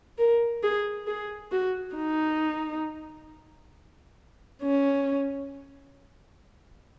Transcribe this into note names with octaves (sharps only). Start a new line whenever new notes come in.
A#4
G#4
G#4
F#4
D#4
C#4